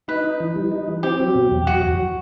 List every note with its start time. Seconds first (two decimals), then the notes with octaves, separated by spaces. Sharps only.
0.08 D#4 B4
0.24 D#4
0.40 E3
0.56 G3
0.72 D#4
0.88 E3
1.03 C4 G4
1.20 F#3
1.35 B2
1.51 E2
1.67 F#3 F#4
1.83 E2